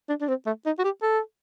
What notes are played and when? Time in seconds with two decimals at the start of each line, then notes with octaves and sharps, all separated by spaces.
0.09 D4
0.21 D4
0.28 C4
0.46 A3
0.66 D#4
0.79 F#4
0.84 G4
1.02 A4